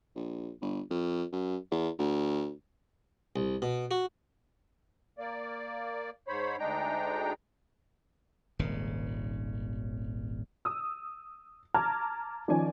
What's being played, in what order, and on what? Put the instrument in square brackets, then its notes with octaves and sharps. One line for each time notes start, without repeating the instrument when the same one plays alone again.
[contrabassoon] A#1
G1
F2
F#2
E2
D2
[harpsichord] C2
B2
F#4
[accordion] A#3 D5
G#2 C5 C#5 B5
D2 G#3 D4 D#4 G5 A#5
[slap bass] D#1 G#1 C#3
[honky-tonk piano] D#6 E6
A5 A#5 D6 F6 G#6
D#3 F3 C#4 D5 G#5